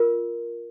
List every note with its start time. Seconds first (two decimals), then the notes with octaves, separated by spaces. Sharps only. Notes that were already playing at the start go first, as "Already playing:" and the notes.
Already playing: F4 A#4